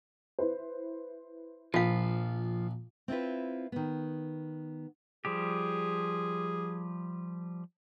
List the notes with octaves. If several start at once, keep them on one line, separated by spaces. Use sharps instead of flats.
E4 B4 C5
A#1 F3 F4 F5
C4 E4 F4 B4
D#3 B3
F3 G3 G4 G#4